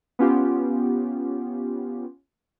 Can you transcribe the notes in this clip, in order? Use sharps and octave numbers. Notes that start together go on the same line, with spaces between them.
B3 C#4 F4 G4